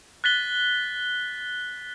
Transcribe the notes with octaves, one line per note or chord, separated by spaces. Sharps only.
F#6 A6 B6 G7